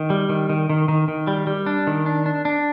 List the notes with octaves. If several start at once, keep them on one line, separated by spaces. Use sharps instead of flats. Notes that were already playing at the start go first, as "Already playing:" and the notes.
Already playing: D#3
G3
D#3
D#3
D#3
D#3
D#3
G3
G3
D4
D#3
D4
D4
D4